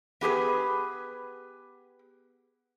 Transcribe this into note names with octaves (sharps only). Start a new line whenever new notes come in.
B3 G4 G#4 B4